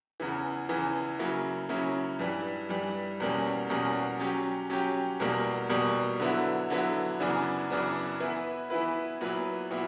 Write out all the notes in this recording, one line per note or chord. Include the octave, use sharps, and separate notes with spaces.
E2 C#3 E3
E2 C#3 E3
C#3 F#3 A#3 C#4 E4
C#3 F#3 A#3 C#4 E4
G2 E3 G3
G2 E3 G3
E2 B2 G3 A#3 C#4
E2 B2 G3 A#3 C#4
F#3 C#4 G4
F#3 C#4 G4
E2 B2 G3 A#3
E2 B2 G3 A#3
D3 F#3 B3 E4
D3 F#3 B3 E4
F#2 C#3 E3 B3 D4
F#2 C#3 E3 B3 D4
E3 B3 E4 B4
E3 B3 E4 B4
A#2 F#3 B3 E4 B4
A#2 F#3 B3 E4